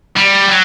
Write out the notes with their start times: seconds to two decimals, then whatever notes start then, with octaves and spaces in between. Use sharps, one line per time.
0.17 G3
0.49 F#3